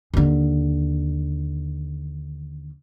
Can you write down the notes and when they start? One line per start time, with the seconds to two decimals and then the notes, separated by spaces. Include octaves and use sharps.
0.14 D#2 D3